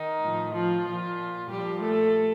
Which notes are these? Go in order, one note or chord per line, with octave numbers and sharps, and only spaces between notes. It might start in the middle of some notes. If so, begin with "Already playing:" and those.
Already playing: D#3 D#4
A2 F3
F3 F4
A#2 F3
A#2 F3 G3 G4
A3 A4